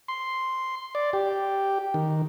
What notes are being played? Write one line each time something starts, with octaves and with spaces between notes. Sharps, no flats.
C6
D5
G4
D#3